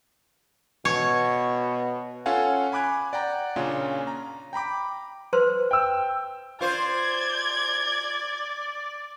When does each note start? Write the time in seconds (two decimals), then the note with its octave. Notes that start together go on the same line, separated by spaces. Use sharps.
0.85 B2 C#5
2.26 C#4 F4 A4 F5 F#5 G#5
2.72 G#5 B5 D6 F#6 G#6
3.13 D5 F#5 G5 A#5
3.56 A#2 C#3 C#4 D4 F4
4.07 A#5
4.53 G5 A#5 B5 D6
5.33 B4 C5 C6
5.71 G5 E6
6.61 F4 C5 D5 G#6